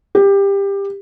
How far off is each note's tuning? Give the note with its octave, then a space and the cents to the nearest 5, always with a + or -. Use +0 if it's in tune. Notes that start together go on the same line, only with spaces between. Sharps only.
G4 +20